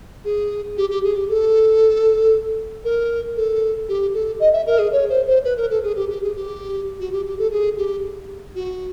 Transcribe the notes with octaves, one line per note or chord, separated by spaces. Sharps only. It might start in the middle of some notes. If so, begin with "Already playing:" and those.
G#4
G4
G4
G#4
G4
A4
A#4
A4
G4
A4
D#5
E5
A#4
G#4
C#5
C5
C5
B4
A#4
A4
G#4
G4
G4
G#4
G4
F#4
G4
G4
A4
G#4
G4
F#4